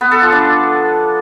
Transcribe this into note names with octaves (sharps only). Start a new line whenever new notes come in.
B3
A4
F3
D4